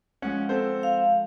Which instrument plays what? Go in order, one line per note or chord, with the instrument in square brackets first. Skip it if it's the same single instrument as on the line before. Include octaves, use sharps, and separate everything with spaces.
[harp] F3 G#3 F#5 [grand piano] C#4
[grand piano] C4 A4 C5
[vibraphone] F5